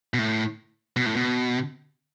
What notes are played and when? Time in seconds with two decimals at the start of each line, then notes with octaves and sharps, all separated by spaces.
0.14 B2
0.19 A2
0.96 B2
1.06 A2
1.16 B2